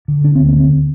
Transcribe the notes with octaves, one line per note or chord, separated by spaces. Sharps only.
D3
D3 D4
D2 C4
A#3
D3 C4